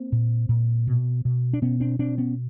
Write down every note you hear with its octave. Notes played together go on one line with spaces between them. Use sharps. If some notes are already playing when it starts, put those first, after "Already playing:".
Already playing: A#3 C4
A#2
A#2
B2
B2
D4
B2 B3 C#4
C4 D4
B2 C4 D4
B3 C#4